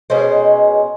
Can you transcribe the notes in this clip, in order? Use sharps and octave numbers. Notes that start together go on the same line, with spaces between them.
B2 G#3 C#4 C5